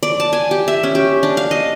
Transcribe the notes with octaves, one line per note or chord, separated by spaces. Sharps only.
D5
A5
G#5
G4
E5
C#4
G4
D4
F5
D#5